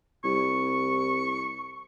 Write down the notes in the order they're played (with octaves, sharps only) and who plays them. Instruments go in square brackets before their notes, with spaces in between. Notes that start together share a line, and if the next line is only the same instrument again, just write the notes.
[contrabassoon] C2 [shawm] C#6